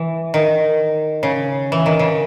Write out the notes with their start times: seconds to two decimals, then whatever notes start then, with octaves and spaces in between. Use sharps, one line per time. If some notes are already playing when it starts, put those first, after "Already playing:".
Already playing: E3
0.34 D#3
1.23 C#3
1.72 E3
1.86 D#3
1.99 C#3